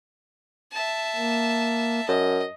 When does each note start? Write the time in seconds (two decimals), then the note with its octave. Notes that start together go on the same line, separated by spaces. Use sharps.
0.73 E5 A5
1.15 A#3
2.08 F#2 D#5